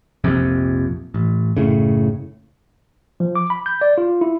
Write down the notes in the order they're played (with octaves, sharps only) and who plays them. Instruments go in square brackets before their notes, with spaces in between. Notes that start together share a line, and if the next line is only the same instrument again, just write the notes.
[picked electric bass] A#1 F2 C3
A1
F#1 A2 C#3
[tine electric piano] F3
D6
B5
G6
D5
F4
E4